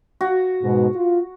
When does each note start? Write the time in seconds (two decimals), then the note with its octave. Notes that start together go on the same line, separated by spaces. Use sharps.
0.21 F#4
0.63 G#2 B2
0.95 F4